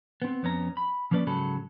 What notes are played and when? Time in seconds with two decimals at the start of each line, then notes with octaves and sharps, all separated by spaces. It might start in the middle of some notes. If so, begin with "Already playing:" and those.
0.22 B3 C4
0.43 F2 B3 C#4 A#5
0.77 B5
1.11 F3 A#3 C#4 B4 D5
1.27 G#2 C#3 F#3 A4 B5